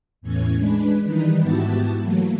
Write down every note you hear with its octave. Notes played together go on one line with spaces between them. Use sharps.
E2 A2 E3 C#4 G#6
G#3 D4 B4
D#3 E3 G3 D#4 B4
G#2 B3 E4 F#4 G4 A5
E3 F#3 A3 A#3